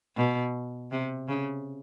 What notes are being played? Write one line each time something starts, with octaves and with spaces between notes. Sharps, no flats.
B2
C3
C#3